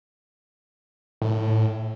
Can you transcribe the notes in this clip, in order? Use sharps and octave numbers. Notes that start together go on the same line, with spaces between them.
A2